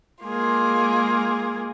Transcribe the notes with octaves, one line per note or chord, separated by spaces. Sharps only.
G#3 A#3 F4 G#4